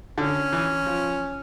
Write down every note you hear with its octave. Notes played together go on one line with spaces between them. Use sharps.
D3 C#4
E3
F3